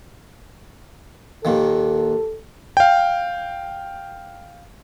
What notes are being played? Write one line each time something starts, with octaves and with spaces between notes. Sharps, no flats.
D#2 A#2 D#3 A4
F5 G5